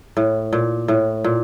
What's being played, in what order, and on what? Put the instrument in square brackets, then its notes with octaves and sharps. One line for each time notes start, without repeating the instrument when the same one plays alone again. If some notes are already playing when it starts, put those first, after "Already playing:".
[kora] A2
A#2
A2
A#2